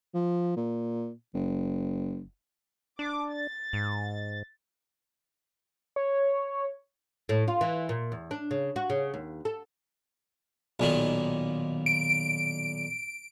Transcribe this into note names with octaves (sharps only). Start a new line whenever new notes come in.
F3
A#2
F#1
D4 D6
A6
G#2
C#5
A2
F4
E3
A#2
E2
D4
C#3
F#4
C#3
D#2
A4
B1 A#2 D#3
D7